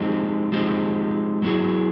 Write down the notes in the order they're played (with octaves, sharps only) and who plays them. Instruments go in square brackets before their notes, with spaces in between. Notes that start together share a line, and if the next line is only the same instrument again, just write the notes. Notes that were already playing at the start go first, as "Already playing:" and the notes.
Already playing: [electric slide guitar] F3 G#3 C4 D#4 G4
F3 G#3 C4 D#4 G4
F#3 B3 E4 G#4